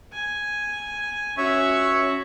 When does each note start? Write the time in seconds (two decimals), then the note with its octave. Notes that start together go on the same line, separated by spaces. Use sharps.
0.13 G#5
1.37 C#4 F#4 C#5 E5 C#6